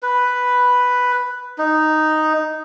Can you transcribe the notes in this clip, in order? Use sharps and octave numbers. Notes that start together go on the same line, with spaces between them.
B4
D#4